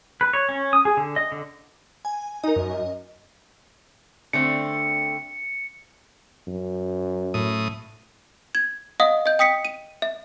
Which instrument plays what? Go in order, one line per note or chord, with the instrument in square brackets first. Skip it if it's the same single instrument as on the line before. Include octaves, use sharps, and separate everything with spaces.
[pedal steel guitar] B4
C#5
C#4
D#6
G#4
D3
D#5
D3
[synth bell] G#5
[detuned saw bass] D#4 [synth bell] A#4 D#5
[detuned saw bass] F#2
[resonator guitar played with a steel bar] D3 A3 C4 [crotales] C#7
[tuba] F#2
[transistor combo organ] A2 D#6
[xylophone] G#6
D#5 F5 F#5 D#6
D#5 G6
G5 D#6 B6 C#7
D#7
E5